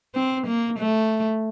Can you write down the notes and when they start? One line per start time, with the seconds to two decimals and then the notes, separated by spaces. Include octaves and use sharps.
0.15 C4
0.47 A#3
0.79 A3